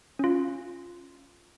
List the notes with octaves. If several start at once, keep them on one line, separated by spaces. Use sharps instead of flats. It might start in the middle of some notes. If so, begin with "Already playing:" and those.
C#4 F4